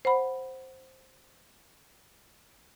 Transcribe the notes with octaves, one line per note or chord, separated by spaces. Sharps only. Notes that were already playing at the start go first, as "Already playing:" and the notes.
C5 F#5 B5